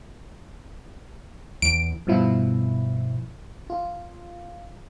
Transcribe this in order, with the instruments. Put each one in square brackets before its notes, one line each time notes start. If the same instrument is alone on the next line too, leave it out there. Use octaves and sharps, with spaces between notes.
[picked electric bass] E2 [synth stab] D7
[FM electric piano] G2 B2 F3 E4
F4